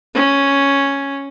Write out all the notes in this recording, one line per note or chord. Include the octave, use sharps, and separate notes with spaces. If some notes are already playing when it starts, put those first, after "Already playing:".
C#4